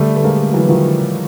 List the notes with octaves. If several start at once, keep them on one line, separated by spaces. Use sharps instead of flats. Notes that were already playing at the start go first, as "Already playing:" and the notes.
Already playing: D3 G3 A3
A3
G#3 A#3
E3 F#3
D#3 F3